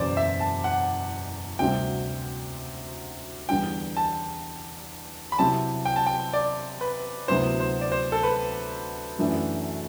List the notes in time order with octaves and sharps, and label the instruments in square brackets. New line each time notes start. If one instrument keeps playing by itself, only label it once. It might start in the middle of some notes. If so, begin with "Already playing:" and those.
Already playing: [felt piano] F#1 E2 B2 [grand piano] C5 D5
[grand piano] E5
A5
F#5
[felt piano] D2 C3 G3 C4 F#4 [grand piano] G5
[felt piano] E2 D3 G3 [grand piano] G5
[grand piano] A5
B5
[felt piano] C3 F#3 C4 E4 G4 [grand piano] A5
[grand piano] G5
A5
G5
D5
B4
[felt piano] D2 C3 F#3 B3 E4 [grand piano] C5
[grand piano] C5
D5
C5
A4
B4
[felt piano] F#2 E3 A3 D4 F#4